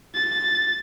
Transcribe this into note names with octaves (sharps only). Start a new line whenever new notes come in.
A6